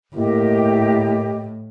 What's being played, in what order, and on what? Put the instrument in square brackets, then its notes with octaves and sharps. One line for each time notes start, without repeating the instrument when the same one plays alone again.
[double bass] A2 [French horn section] A#3 E4 [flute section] G4 D#5